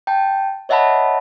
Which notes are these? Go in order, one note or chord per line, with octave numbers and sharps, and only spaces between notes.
G5 A5
C#5 D#5 E5 F#5 A5 B5